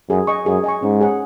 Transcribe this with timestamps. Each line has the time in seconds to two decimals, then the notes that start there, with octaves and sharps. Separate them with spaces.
0.09 F#2 G#4
0.27 D#5 G#5 C#6
0.46 F#2 G#4
0.64 D#5 G#5 C#6
0.83 G#2 C#4
1.01 G#4 C#5 F#5